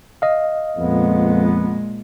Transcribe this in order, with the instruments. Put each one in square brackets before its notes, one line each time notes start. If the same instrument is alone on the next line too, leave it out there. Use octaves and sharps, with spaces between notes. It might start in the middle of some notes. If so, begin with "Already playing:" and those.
[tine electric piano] D#5 F5
[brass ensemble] F2 B3 [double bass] A#2 G#3